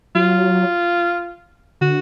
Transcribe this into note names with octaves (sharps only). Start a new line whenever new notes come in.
F#3 F4
D3 F#4